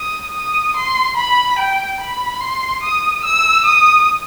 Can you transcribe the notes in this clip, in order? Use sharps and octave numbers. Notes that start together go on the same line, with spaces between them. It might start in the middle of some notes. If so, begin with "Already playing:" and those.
Already playing: D#6
D#6
C6
B5
G5
B5
C6
D#6
E6
D#6